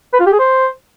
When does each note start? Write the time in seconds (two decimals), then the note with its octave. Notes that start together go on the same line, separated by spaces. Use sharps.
0.14 B4
0.20 F4
0.26 G4
0.33 G#4
0.39 C5